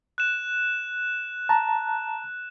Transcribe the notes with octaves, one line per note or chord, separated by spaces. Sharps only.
F#6 E7
A5 A#5